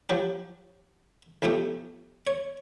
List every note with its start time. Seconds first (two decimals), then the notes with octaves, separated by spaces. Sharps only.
0.09 F3 F#3 G4
1.42 B1 F2 A3 G4 D#6
2.27 C#5